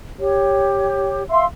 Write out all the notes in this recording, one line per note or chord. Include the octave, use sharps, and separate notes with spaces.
G4 C#5
E5 F5 C6 E6